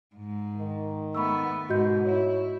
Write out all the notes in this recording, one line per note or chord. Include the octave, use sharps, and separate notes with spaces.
G#2
D#3
A3 B3 B5 C#6 E6
G#2 B2 F#4 D#5 G6
E4 C#5